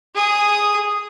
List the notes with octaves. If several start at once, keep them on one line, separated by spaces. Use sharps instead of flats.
G#4 D#6